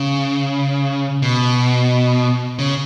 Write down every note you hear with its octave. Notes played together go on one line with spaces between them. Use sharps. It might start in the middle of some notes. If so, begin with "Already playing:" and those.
Already playing: C#3
B2
C#3